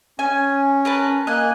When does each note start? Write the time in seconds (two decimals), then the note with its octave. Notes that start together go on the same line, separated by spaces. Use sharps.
0.19 C#4 G#5
0.85 A#4 B4 A5
1.27 A#3 D#5 G#5 F#6